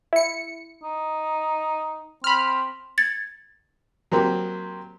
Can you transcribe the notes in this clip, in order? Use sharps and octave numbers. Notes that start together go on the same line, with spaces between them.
E4 C#7
D#4
C4 B5 F6
G#6 A6 C#7
F#3 A#3 C4 G4